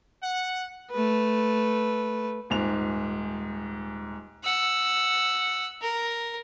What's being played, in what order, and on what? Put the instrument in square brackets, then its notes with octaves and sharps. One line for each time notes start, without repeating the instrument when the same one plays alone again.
[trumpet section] F#5
[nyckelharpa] A3 B4
[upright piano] D#1 G#2 F7
[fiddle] F#5 E6
A#4